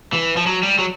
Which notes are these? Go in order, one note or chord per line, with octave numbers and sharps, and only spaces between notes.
E3
F3
F#3
G3
F#3